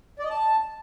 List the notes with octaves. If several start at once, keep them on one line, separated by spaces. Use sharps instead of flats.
D5
D#5
A5